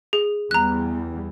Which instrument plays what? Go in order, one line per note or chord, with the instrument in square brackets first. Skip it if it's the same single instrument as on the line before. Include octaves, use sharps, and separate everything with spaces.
[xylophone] G#4
[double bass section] E2 E3 G3 [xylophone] A#5 F#6